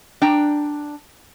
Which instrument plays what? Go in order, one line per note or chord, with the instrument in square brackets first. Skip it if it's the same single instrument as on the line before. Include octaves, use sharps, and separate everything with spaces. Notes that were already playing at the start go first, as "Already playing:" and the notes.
[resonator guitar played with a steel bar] D4 G5 A#5